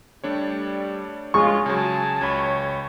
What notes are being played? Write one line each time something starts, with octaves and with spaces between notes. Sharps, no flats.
G3 A3 D4 C#5
G#3 C#4 F4 C#6
C#3 F#3 G#5 A5
C#2 C#5 B5